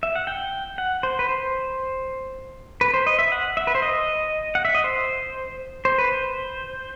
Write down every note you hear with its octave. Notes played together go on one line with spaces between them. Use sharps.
E5
F#5
G5
F#5
C5
B4
C5
B4
C5
D#5
E5
F#5
E5
B4
C5
D#5
F#5
E5
D#5
C5
C5
B4
C5